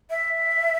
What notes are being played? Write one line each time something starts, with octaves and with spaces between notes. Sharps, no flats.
E5